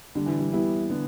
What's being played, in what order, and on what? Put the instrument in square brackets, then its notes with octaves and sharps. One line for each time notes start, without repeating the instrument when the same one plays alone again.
[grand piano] D3 [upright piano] G3
[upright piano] E3
G3
[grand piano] G3 E4 [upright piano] B3
[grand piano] D3 [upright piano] B3